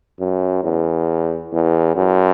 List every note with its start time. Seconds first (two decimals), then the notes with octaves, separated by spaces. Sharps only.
0.20 F#2
0.63 E2
1.52 E2
1.96 F#2